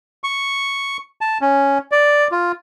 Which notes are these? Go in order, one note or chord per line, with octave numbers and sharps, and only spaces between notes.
C#6
A5
C#4
D5
F4